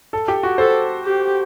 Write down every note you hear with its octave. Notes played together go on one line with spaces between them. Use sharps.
A4
G4
F#4
A4 C5
G4